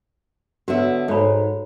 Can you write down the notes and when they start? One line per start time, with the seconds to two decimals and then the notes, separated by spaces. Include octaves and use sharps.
0.68 D3 B3 F#4 C#5 E5
1.08 G#2 A4 C#5 B5